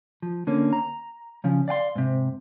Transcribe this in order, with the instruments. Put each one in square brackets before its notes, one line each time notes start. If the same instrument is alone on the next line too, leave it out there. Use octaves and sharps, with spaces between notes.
[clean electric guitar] F3
D3 A#3 C#4
A#5
C#3 F3 C#4
D5 F5 G5 C6
G#2 C3